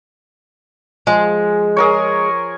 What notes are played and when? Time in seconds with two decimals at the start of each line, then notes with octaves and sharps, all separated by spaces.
1.07 F3 G#3
1.77 G#4 A#4 C#5